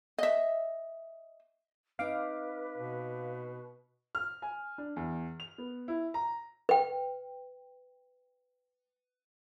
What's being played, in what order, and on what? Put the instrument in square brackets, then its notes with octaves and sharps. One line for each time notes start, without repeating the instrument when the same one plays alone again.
[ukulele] D#5 E5
[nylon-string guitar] C4 D#4 [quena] B4 [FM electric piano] F5 D6
[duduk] B2
[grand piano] F6
G#5
D4
E2
F7
B3
E4
A#5
[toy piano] B4 G5